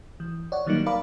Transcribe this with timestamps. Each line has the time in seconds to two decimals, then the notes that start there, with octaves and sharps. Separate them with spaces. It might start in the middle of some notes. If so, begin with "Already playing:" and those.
0.20 E3
0.52 C#5 D5 F#5
0.67 D#3 F#3 G3 A#3 D#4
0.86 A#4 D5 F5 B5 D6